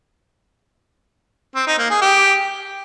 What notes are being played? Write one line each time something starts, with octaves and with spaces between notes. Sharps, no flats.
C4
D#4
A#3
G#4
G4